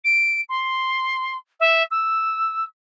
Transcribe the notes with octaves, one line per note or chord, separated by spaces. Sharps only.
D7
C6
E5
E6